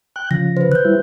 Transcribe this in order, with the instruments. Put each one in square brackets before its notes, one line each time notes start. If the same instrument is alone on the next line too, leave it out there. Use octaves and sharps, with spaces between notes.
[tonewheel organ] G5 F#6
[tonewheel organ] C#3 F3 [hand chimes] A#6
[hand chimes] B4 C5
F#6 G6
[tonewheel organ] G3 E4